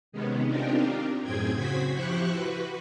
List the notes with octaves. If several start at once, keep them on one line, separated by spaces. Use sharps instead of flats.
C3 D#3 G#3 B3 C#4
C4 D4 D#4 F4 G4 A#4
F#2 A2 C4 G#4 G5 G#6
C#3 F#4 C5 G#6 B6
F3 E4 G4 C5 C#6 F#6
F#4 B4